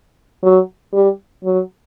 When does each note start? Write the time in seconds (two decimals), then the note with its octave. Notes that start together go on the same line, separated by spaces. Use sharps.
0.43 F#3
0.93 G3
1.44 F#3